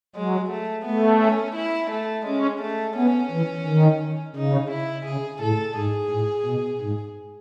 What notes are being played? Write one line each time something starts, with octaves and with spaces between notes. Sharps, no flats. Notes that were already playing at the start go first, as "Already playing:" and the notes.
F#3 G#3
A3
A3 B3
C#4
E4
A3
G#3 C#4
A3
B3 C#4
E3
D#3
C#3 D#4
E4
C#3 G#4
A2 A4
G#2 G#4
A2
B2
G#2